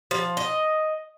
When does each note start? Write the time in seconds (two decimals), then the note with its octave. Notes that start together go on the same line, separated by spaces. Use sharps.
0.11 F3
0.37 D#5